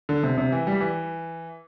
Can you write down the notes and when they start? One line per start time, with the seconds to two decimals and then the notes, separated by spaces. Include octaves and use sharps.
0.09 D3
0.23 C3
0.38 C3
0.52 E3
0.67 G3
0.80 E3